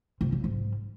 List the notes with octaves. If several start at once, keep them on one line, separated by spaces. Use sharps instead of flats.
C3
C#3
G#2